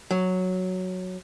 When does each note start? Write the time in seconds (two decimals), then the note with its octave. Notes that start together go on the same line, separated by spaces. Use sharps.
0.11 F#3